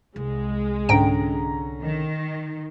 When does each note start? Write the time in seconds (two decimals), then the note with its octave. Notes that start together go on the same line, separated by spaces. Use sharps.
0.16 C2 G#3
0.89 G#2 D3 C#4 G5 A#5 D7
1.83 D#3